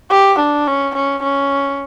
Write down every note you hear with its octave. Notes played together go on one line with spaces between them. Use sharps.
G4
D4
C#4
C#4
C#4